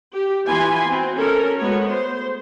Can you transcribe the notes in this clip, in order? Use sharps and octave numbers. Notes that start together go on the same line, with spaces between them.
G4
E3 B3 F4 G#5 B5 C6
C4 F#4
C#4 A4 A#4
G#3 A3 B3 F#4 C#5
C5